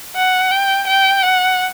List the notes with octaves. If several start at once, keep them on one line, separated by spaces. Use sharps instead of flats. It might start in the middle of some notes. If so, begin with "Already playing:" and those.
F#5
G5
G5
F#5